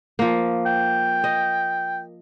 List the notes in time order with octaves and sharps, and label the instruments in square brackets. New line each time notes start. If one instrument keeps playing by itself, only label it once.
[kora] F3 A#3
[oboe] G5
[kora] D#5